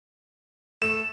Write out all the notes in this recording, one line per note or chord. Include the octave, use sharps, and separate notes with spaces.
A3 E7